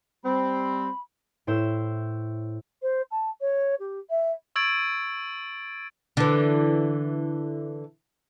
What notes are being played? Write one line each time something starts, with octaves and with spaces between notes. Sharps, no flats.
G3 C4 B5
A2 E4 C5 E6 G6 E7
C5
A5
C#5
G4
E5
C#6 E6 G#6 A6 D7
D3 E3